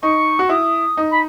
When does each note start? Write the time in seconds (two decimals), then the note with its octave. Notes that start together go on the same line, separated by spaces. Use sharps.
0.02 D#4 C#6
0.39 F#4
0.49 E4 D#6
0.97 D#4
1.11 B5